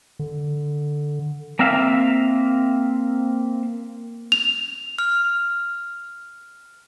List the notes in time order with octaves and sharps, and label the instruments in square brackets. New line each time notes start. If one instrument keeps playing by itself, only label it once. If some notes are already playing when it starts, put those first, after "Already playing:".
[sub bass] D3
[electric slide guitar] A#3 C4 E5 F5
[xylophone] F7
[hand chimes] F6